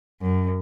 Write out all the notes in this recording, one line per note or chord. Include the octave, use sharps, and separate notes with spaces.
F#2